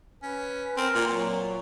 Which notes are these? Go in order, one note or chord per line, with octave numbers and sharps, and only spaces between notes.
C#4 B4
C4 A#4
A#2
A#2 F#3